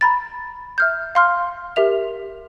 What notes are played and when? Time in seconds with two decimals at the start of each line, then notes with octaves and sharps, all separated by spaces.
0.01 A#5 B5 A6
0.78 E5 F6 G6
1.15 F5 C6 F6
1.76 G4 A#4 E5 F7